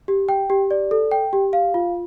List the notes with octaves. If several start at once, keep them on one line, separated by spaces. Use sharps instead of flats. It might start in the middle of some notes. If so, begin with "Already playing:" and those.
G4
G5
G4
D5
A4
G5
G4
F5
F4